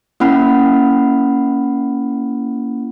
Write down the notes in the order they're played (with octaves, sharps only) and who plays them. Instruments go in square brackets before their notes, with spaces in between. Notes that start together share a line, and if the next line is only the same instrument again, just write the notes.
[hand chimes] A#3 C#4 E4 F#5 B5 F6